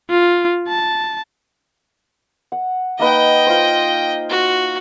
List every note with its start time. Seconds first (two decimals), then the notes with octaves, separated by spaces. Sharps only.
0.10 F4
0.68 A5
2.52 F#5
2.99 A#3 D#4 B4 D#5 G5
3.47 F4 C5
4.30 F#4